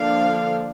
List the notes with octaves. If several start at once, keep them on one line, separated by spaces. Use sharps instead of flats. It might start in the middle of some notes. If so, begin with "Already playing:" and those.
Already playing: D3 F3 A#3 D4 F5